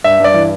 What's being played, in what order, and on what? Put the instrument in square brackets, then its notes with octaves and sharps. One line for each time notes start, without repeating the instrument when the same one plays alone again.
[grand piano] G2 E5
G2 D5
E3